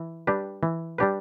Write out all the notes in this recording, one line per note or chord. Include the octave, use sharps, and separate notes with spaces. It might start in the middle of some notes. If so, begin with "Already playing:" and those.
Already playing: E3
G3 D4 G4 B4
E3
G3 D4 G4 B4